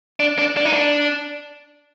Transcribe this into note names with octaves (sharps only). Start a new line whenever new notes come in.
D4
D4
D4
D#4
D4